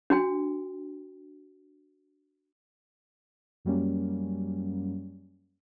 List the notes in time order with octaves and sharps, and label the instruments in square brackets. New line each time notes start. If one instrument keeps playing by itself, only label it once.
[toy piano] D4 F#4 G5
[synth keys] F#2 F#3 G3 A#3 C#4